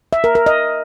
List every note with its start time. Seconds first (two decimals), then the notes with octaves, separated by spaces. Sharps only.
0.13 E5
0.24 A#4
0.35 A#4
0.46 D#5